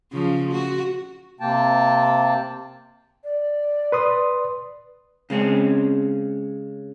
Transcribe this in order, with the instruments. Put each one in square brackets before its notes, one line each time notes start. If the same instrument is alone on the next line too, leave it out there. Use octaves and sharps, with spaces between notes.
[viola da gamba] C#3 F3
F#4
[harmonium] C3 A#3 G5 A5
[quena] D5
[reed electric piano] B4 C6 D#6
[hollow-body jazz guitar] C#3 G#3 C4 C#4